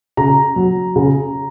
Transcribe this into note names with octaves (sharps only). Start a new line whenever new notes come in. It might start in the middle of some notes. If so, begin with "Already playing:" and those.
C#3 A#5
F#3
C#3